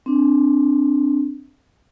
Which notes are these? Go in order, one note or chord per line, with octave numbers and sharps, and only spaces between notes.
C4 D4